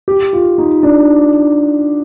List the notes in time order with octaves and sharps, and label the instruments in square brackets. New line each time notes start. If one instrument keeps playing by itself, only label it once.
[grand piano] G4
F4
D#4
D4